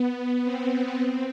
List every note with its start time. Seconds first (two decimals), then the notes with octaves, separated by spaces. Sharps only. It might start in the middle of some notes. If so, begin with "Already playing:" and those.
Already playing: B3
0.44 C4
0.99 C4